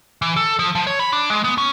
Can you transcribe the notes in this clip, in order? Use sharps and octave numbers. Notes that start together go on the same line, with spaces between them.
E3
A4
F3
F3
C#5
B5
D4
G#3
B3
C#4